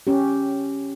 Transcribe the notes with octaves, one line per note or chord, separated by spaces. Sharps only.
C#4 G4